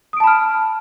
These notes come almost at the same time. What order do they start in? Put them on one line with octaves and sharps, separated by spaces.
D#6 D7 A5 B5 F6